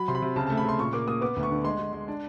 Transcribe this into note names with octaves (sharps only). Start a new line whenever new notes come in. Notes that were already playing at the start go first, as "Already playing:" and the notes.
Already playing: F#3 B5
C3 C6
B5
C3
C#3 A5
A5
A3
B5
C#3 C6
A#2 C#6
A#3 D6
A#3 D#6
B3 D6
D2
C#6
D3
G#3 C6
G#3
G#3
D4